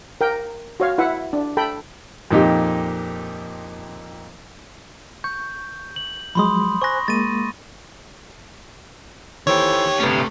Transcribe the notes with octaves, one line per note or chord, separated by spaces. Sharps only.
A#4 G5
F#4 C#5 F5
E4 B4 E5 F#5
D4
A4 G5 B5
F2 A#2 D#4 G4
C#6 G6
F#7
F3 F#3 G#3 B5 C6 D#6
C5 G#5 C#6 F#6 A#6
G#3 A#3 A6 D#7
D#3 E3 G4 A4 C5 C#5
G2 C3 A3 B3 C#4 G4